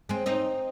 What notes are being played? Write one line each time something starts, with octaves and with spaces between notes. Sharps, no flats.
G#3 C4
C4 D#4